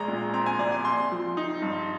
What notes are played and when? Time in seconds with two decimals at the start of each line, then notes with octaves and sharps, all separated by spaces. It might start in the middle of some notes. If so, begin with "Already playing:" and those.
Already playing: A#1 G#3 A#5
0.08 A#2
0.33 C4 A#5
0.46 G#5
0.59 C2 D5
0.72 G#5
0.85 C4 C6
1.12 F3
1.37 D#4
1.62 G2